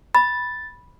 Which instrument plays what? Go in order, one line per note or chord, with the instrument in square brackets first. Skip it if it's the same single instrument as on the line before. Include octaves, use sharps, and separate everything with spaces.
[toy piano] B5 [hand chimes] A6